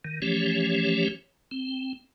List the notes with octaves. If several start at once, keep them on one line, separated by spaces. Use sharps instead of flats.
D#3
E3 F3 A3 C#4 G4 C#5
C4